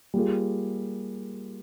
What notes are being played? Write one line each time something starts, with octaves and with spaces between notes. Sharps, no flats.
G3 A#3 F4 G#4